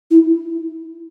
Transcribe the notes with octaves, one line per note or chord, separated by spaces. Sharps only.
E4